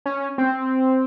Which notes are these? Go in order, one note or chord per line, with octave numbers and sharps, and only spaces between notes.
C#4
C4